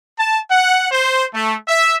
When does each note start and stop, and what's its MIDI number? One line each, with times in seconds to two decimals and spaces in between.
0.17 0.37 81
0.48 0.89 78
0.91 1.23 72
1.32 1.54 57
1.68 1.95 76